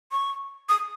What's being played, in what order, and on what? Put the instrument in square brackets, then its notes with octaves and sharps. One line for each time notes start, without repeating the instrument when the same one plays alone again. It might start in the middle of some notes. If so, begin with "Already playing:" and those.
[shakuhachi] C#6
D#6